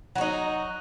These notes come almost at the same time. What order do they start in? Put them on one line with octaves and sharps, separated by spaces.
F#3 F#4 D#4